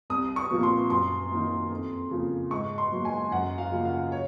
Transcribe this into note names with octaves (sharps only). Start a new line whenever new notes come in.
C2 D#6
C#6
A#2 F3 A#3
C6
F#2 C6
D#3 A#3
F2
C#3 F3 A#3
G#2 C#6
C6
F#3 A#3
G#5
F#2 F#5
F5
C#3 F3 A#3
F5
C#5